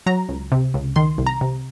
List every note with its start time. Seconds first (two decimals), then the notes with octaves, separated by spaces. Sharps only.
0.06 F#3 A#5
0.29 C#2
0.52 C3
0.74 C#2
0.96 D#3 C6
1.18 C2
1.27 A#5
1.41 C3